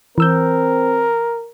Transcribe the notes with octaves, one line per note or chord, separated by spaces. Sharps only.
E3 C4 A#4 E6 G6